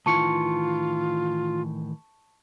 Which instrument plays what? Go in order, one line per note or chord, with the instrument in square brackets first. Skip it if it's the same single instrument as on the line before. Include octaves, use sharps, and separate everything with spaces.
[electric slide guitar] A2 D#3 E3 [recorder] F4 [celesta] A5 C#6 C#7